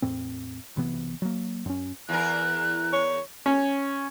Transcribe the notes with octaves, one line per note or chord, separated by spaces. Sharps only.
E2 A2 C4
B1 C3 E3 B3
F#3 A#3
F#2 C#4
E2 A#4 F#6
C#5
C#4